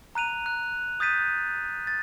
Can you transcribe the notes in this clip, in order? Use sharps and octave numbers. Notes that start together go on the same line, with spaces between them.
A#5 F#6 D#7 F7
F#6
D#6 G6 A6 B6 D#7
A6